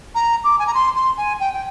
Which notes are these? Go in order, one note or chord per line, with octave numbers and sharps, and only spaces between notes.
A#5
D6
G#5
A#5
C6
C6
G#5
G5
G5